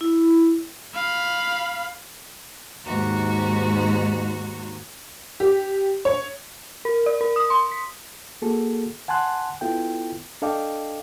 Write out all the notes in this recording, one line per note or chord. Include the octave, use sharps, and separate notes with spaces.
E4
F5 B5
D#2 G#2 F#4 A#5
G4
C#5
A#4
D5
A#4
D#6
C6
B6
A#3 F#4 G#4 A4
F#5 G#5 A5 C6 F#6
B3 E4 F4 A4 G5
D4 A4 D#5 F5 G5 D6